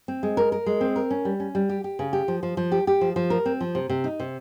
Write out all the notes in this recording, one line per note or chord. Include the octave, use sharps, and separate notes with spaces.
C4
G#3
A#4
A#4
G#3
C4
A#4
C#4
G3
C#4
G3
G4
G4
C#3
G4
F3
F3
F3
G4
G4
F3
F3
A#4
C4
F3
C3
C3
D#4
C3